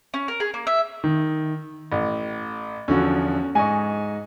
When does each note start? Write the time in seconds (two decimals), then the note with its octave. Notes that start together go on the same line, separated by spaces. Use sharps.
0.14 C#4
0.28 A#4
0.40 G#4
0.54 A#3
0.67 E5
1.04 D#3
1.92 A1
2.88 E2 D3 F3 C#4 F#4
3.55 G#2 D#5 G#5 C#6